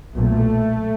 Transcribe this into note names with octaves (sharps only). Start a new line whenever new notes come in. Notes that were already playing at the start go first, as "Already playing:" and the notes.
B1 A#2 A3